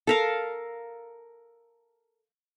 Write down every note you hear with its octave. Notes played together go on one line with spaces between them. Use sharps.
A4 A#4 F5